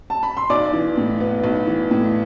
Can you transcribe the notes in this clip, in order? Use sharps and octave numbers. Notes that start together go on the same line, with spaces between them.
A5
B5
C6
B1 D5 D6
E3
A2
B3
B1
E3
A2